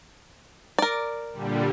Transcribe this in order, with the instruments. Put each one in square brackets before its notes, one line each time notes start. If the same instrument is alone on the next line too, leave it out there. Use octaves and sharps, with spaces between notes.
[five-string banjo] A#4 D5
[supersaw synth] A#2 D3 G3